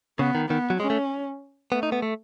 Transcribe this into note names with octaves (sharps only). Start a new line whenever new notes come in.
C#3 B3
D#3
D#3 B3
F#3
G#3 C#4
A3
A3 B3
D#4
B3
A3